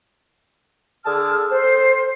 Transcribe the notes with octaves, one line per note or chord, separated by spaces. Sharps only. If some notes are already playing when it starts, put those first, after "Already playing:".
D3 G#4 A5 E6 F6
C4 A4 C5